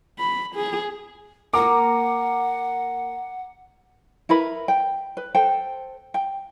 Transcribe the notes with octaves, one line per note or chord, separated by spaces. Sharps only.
B5
G#4
A#3 F#5 A#5 D6
E4 A#4 B4 B5
G5
B4
A4 C5 G5
G5